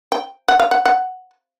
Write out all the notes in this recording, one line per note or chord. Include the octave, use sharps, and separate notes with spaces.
G5
F#5
F5
F#5
F#5